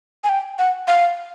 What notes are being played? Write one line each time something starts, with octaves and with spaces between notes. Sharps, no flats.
G#5
G5
F#5
F5